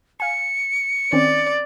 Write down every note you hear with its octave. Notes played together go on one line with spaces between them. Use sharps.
F5 G#5 C#7
D#3 C4 C#4 D5